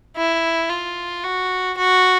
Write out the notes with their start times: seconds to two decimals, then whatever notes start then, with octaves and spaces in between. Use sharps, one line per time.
0.17 E4
0.70 F4
1.24 F#4
1.77 F#4